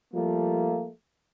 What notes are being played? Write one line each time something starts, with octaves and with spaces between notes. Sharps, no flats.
F3 G3 A3 A#3